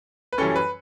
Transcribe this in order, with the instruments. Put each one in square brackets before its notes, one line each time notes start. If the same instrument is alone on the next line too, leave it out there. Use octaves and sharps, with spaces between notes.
[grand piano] B4
F#2 E3 G3 C#4 A4
B4